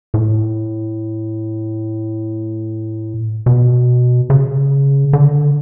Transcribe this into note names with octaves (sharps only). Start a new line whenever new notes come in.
A2
B2
C#3
D3